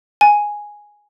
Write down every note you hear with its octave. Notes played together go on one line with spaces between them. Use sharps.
G#5